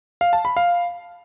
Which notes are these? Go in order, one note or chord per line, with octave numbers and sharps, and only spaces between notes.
F5
A5
B5
F5